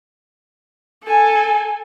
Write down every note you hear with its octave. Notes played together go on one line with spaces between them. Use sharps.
A4 G#5